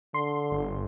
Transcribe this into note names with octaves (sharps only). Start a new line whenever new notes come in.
D3 C6
G1